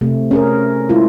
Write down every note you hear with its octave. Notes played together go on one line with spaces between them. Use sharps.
C3 A3
C#4 G#4 A#4
G#3 E4 F4